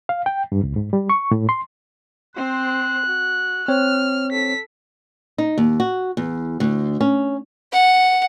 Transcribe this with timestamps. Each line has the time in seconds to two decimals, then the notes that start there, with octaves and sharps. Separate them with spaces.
0.09 F5
0.26 G5
0.52 G2
0.63 C#2
0.76 G#2
0.93 G3
1.10 C#6
1.31 A2
1.49 C6
2.36 C4 C5 F#6
3.06 F#4
3.68 C4 C#5 F6
4.31 A4 B6
5.38 D#4
5.58 D#2
5.80 F#4
6.17 E2
6.60 D2
7.01 C#4
7.72 F#5